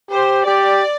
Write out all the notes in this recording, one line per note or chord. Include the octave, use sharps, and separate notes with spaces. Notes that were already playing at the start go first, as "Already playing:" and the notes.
G4 C5
G4 D5